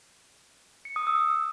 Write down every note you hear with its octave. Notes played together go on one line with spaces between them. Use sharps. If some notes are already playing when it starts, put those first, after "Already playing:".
C#7
D#6
E6